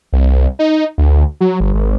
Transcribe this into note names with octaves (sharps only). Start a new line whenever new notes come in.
C2
D#4
D2
F#3
G1
G#1